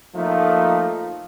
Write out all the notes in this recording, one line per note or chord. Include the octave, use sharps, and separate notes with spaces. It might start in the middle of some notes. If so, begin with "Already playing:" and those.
F3 A3 A#3 D#4 F4